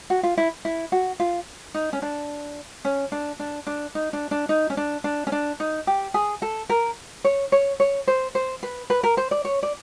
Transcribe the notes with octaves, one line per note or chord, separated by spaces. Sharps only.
F#4
F4
E4
E4
F#4
F4
D#4
C#4
D4
C#4
D4
D4
D4
D#4
D4
D4
D#4
C#4
D4
D4
C#4
D4
D#4
G4
G#4
A4
A#4
C#5
C#5
C#5
C5
C5
B4
B4
A#4
C5
D5
C#5
D5